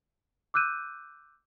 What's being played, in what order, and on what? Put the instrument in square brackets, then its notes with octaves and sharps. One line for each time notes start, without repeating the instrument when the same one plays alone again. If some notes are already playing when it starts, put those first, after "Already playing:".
[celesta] D6 E6 F#6 G6 D#7